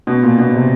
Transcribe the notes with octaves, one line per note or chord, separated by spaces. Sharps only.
B2
A#2
B2
C3